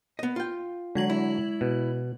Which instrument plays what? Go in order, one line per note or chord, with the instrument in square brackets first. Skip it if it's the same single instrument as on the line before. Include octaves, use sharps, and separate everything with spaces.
[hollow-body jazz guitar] B3 D#5
F4 G5
[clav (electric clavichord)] D3 F#3 [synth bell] G#3 G#6 F#7
[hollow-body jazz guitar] E4
[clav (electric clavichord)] B2